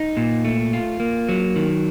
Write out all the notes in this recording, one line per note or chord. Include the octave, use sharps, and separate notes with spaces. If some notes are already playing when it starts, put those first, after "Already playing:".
Already playing: D#4
A#2
A3
F4
A#3
F#3
D#3